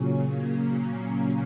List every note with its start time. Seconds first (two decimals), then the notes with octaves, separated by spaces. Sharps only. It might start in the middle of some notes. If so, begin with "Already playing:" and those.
Already playing: A#2 C#3 F#3 C#4
0.26 A#3
0.77 C#3 C#4